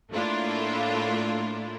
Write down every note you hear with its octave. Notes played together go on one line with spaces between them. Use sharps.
A2 A3 A#3 D4 E4 F4